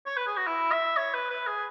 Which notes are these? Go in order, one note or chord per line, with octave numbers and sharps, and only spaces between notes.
C#5
B4
G#4
F#4
E4
E5
C#5
B4
B4
G#4